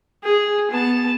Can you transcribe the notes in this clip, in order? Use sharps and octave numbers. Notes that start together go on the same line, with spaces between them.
G#4
B3 A5